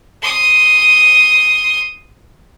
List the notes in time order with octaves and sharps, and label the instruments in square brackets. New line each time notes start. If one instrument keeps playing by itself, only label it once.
[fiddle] C6 D#6